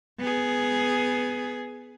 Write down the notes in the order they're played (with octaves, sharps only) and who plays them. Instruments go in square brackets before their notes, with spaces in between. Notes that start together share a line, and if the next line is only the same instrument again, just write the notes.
[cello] B3 G#4